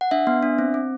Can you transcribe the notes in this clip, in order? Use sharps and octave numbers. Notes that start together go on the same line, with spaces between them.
F#5
D4 E5
B3
D4
C4
C4